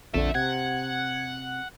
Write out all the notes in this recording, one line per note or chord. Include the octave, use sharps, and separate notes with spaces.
A#1 F2 D3 E5 A5
C3 F#5 G#6